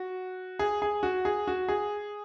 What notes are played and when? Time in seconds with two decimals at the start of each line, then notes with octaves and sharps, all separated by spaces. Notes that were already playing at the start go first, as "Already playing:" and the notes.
Already playing: F#4
0.59 G#4
0.82 G#4
1.03 F#4
1.25 G#4
1.47 F#4
1.68 G#4